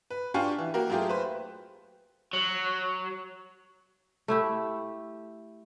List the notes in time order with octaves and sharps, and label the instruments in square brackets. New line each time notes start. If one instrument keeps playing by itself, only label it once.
[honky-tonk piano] B4
D4 F4 G4 F5 G#5 C#6
E3
A#3 F#4 G4 A#4
F#3 A3 F4 G4 G#4
B4 C5
[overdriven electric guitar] F#3
[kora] A3 E4 G4